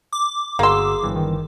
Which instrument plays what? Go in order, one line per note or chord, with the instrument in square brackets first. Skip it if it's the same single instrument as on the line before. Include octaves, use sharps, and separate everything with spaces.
[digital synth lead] D6
[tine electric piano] G1 F#4 E6 [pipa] A#3 C6 [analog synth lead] G#4
[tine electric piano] G1 G2 E3
[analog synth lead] D#3